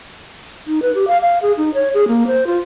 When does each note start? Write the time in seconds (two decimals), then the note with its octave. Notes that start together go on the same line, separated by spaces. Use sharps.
0.67 D#4
0.82 B4
0.95 G4
1.08 F5
1.22 F5
1.42 G#4
1.57 D#4
1.74 C#5
1.94 G#4
2.08 A#3
2.27 C5
2.47 F4